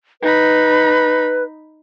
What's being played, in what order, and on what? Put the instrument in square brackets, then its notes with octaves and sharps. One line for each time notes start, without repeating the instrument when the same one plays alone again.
[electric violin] D#4 B5 [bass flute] B4